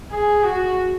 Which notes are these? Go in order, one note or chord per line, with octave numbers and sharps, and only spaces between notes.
G#4
F#4